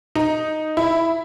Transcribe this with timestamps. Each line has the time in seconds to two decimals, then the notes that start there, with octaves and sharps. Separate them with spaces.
0.15 D#4
0.77 E4